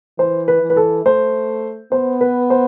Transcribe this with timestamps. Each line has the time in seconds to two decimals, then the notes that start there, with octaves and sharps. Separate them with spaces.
0.18 E3 C5
0.48 B4
0.62 E3
0.70 B4
0.77 A4
1.05 A3 C5
1.92 B3 C5
2.21 B4
2.50 C5